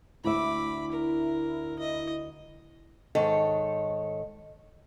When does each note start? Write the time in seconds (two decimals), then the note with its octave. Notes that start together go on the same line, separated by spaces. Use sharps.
0.24 D2 E4 E5 B5 D6
0.92 A#4
1.79 E4 D#5
3.15 G#2 D#3 A4 C#5